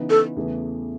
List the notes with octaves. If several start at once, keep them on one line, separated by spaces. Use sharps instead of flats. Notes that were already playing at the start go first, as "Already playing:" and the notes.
Already playing: C#3 E3 B3 D#4
A4
E2 C#3 E3 A3